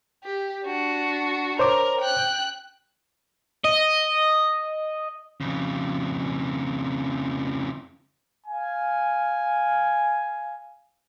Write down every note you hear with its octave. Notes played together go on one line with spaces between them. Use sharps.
G4
D4 F#4
A#4 C5 C#5 D6
G5 F#6
D#5
F2 C#3
F5 G#5